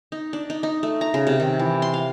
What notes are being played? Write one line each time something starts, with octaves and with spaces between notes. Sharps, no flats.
D#4
D4
D#4
D#4
A3
A#5
C#3
C3
D#3
E3
C6
F5